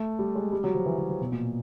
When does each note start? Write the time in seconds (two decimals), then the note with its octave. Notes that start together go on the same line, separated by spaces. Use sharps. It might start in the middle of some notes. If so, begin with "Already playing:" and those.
Already playing: A3
0.19 G3
0.35 G#3
0.52 G3
0.64 F#3
0.75 F3
0.86 E3
0.98 E3
1.09 F3
1.21 B2
1.32 A#2